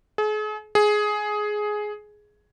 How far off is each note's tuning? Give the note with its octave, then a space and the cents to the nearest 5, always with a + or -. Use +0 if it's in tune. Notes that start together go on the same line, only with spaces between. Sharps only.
G#4 +40
G#4 +10